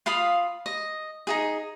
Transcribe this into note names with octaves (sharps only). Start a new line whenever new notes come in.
F4 F5 B5 D#6
D#5
D#4 F#4 G#4